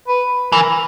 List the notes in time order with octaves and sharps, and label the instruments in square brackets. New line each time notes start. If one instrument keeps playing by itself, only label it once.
[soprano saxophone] B4
[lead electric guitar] E3 [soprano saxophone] A#4